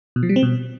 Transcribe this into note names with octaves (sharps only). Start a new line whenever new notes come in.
B2
F3
G3
C4
B2